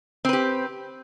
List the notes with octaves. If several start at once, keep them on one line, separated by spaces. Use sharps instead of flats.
C4 G4 B4